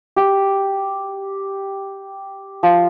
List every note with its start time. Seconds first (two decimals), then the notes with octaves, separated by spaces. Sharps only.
0.16 G4
2.63 F3